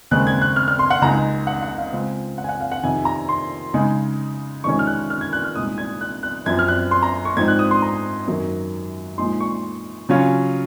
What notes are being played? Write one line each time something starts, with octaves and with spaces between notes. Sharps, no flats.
D#2 C#3 G#3 C4 F#6
G#6
F#6
F6
F6
C6
F#5
C#2 C#3 G#3 D#4 A#5
F#5
F#5
F5
C#3 G#3 C4 F4
F#5
G#5
F#5
F5
F#5
F2 C3 D#3 G#5
A#5
C6
C#3 G#3 D#4
F2 C3 D#3 G#3 C#4 C#6
F6
F#6
F6
G#6
F#6
F6
C2 A#2 G#3 D#4 D#6
G#6
F#6
F#6
F#2 F3 C4 G#6
F6
F#6
C6
A#5
C#6
G#2 F3 C4 D#4 G#6
F#6
D#6
C6
A#5
F#2 D#3 F#3 A#3
A#2 F3 G#3 D#4 C6
C#6
C#3 F#3 C#4 F4